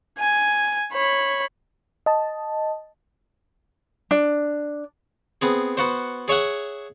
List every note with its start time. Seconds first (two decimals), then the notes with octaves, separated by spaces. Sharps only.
0.19 G#5
0.93 C#5 B5
2.06 D#5 A5
4.11 D4
5.41 B3 C4 G#4
5.77 B3 F#4 C5
6.28 G#4 C#5 E5 F#5